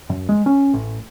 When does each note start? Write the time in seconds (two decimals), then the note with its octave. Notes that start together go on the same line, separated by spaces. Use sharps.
0.10 F#2
0.29 G#3
0.46 C#4
0.73 A1